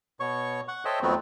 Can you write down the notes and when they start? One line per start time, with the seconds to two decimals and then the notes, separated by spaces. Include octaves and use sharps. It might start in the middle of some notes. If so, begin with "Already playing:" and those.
0.20 B2 C#5 C#6
0.68 F#5 C#6
0.85 A4 C5 C#5 D#5 E5 G5
1.02 F2 D#3 F#3 A3 B3 C4